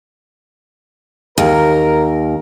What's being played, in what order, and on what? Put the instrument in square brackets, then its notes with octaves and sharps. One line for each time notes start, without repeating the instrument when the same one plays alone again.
[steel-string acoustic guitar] D#2 [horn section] A#4